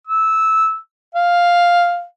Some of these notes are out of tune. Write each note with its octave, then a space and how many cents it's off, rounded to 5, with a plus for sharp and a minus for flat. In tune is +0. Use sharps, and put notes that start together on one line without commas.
E6 -15
F5 +0